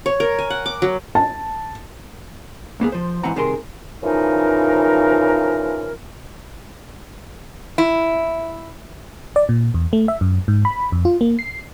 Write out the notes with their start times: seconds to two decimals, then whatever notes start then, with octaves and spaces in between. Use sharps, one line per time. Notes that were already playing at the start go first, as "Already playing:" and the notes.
0.06 C#5
0.20 A#4
0.39 G#5
0.50 F#5
0.66 D6
0.82 F#3
1.15 A5
2.80 B1 A#3 B3 G#4
2.92 F3 C5
3.23 G#2 E3 C4 F#5 A#5
3.36 G2 C3 D#3 G#4 A#4 C6
4.03 C#3 E3 F3 D#4 A#4
7.78 E4
9.36 D5
9.49 A#2
9.74 E2
9.93 A3
10.08 E5
10.21 F#2
10.48 G#2
10.65 B5
10.92 F2
11.05 F4
11.21 A#3
11.39 C7